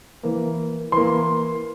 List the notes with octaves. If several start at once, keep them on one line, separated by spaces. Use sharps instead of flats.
E3 A#3
E3 A#3 C6